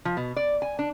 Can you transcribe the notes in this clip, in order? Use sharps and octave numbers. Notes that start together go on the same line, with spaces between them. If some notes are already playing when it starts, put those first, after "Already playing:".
F3
B2
D5
G#5
D4